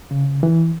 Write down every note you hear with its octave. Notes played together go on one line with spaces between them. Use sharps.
C#3
E3